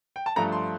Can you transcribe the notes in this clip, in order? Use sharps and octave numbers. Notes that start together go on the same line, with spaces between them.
G5
A5
G2 F3 A3 A#5
C6